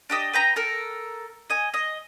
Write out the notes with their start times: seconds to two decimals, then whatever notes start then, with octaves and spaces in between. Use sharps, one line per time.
0.10 D4 G4 D#5
0.33 B4 G5 A#5
0.56 A4 A#4
1.50 D#5 G#5
1.74 D#5